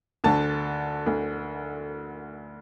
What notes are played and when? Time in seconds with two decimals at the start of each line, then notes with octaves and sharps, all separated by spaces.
0.24 D2 D3 A5
1.06 D2 D3